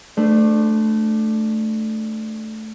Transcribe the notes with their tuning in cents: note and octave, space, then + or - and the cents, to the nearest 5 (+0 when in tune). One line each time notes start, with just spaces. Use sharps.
A3 -5 D4 +15 C5 -25